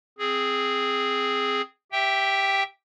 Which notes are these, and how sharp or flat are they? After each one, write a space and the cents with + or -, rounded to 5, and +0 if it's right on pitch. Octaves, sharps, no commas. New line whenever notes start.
C4 +0 G#4 +0
G4 +0 E5 +0 G5 +0